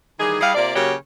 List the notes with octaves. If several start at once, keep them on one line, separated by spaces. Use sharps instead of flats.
D#3 E3 G3 G#4
G3 E4 G#4 D#5 F5
C3 A#3 F4 D5
C#3 F#3 A#3 F#4 G4 C#5